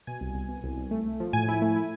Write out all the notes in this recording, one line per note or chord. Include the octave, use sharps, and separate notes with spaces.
B2 G#5
C2
C2
B2
C2
C2
A3
A3
F3
A2 G#5
E4
A3
E4